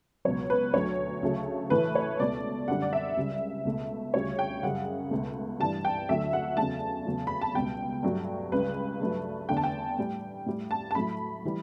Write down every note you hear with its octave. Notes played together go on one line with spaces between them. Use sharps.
C#2 B2 F#3 C#5
B4
D2 D3 F#3 A3 C#5
D2 C#3 F#3 A3
A2 E3 A3 B4
C#5
C#2 B2 A3 D5
F#2 D3 G3 F#5
D5
E5
C#2 C#3 G3
C#2 B2 A3
D2 C#3 G3 C#5
G5
F#2 C#3 G3 F#5
C#2 B2 A3
G2 E3 G3 A5
G5
D2 D3 F#3 A3 E5
F#5
E2 C#3 F#3 A3 A5
E2 C#3 F#3 A3
B5
A5
C#2 B2 G3 G5
G2 F#3 A3
C#2 C#3 G3 B4
G2 F#3 A3
E2 D3 A3 G5
A5
G5
A2 G3
A2 G3
A5
A5
A2 F#3 A3 B5
E3 G3